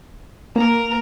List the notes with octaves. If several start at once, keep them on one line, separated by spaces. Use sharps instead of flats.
A#3 A#4 A#5